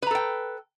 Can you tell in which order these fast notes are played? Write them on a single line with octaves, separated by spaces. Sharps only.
B4 A#5 A4 G5